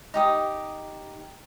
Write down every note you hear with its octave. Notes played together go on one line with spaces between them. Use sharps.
D#4 G4 D#6